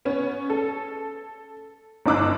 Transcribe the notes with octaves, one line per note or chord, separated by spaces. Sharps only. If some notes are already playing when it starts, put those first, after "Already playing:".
B3 C#4
A4
G1 F#2 D#4 D6 E6 F#6